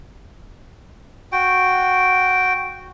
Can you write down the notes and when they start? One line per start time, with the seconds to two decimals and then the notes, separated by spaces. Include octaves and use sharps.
1.32 F#4 G5